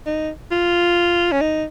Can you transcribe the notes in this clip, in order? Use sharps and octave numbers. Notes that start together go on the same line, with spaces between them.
D#4
F4
C#4
D#4